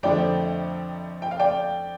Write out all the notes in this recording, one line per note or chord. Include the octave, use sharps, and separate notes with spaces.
F2 D3 F3 A3 D5 G5
G5
F5
D5 G5